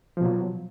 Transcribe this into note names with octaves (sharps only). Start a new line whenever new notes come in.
B2 F3 F#3